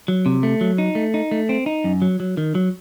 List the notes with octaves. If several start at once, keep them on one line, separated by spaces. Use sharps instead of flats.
F#3
C3
A3
F#3
D#4
A3
D#4
A3
C4
D#4
F#2
F#3
F#3
D#3
F#3